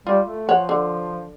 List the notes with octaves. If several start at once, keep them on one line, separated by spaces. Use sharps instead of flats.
G3 F4
A3
F3 C#5 F#5
D3